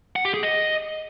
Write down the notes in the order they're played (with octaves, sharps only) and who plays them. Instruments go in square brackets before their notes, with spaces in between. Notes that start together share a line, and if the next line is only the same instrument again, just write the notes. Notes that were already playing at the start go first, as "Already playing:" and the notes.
[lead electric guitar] F#5
G4
G#4
D#5